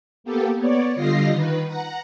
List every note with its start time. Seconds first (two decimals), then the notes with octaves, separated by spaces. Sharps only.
0.24 A#3 B3 G4 A4
0.56 B3 C#5 D5
0.95 D3 G3 F4 D#5 A#6 C7
1.31 D#3 B4
1.66 F#5 A#5 A#6